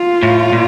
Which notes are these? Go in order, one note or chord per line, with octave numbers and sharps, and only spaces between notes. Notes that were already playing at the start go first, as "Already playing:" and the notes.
Already playing: F4
A2
A#2